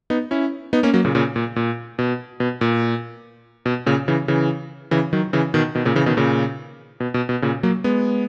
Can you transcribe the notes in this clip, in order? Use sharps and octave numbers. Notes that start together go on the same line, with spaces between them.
B3 D#4
C#4 E4
B3 D#4
A#3 C#4
F#3 A#3
A#2 C#3
A#2 C#3
A#2
A#2
B2
B2
A#2
B2
A#2 C#3
C#3 E3
C#3 E3
C#3 E3
D#3 F#3
C#3 E3
B2 D#3
B2 D#3
A#2 C#3
C#3 E3
B2 D#3
A#2 C#3
B2
B2
B2
A#2 C#3
F#3 A#3
G#3 B3